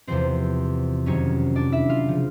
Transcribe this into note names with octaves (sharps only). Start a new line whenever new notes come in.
E2 C3 F3 C4 C5
F2 C3 D#3 F#3 C#4 C#5
D4 D5
E4 E5
F4 F5
C#3 F3